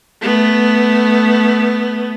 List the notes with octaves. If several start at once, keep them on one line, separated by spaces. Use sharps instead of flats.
A3 B3